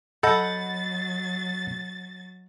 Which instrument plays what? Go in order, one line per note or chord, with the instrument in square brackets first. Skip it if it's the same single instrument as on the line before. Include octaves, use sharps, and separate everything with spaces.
[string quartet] F#3 A6 [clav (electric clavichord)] A4 [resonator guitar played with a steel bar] D#5 F#5 [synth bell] B5 G6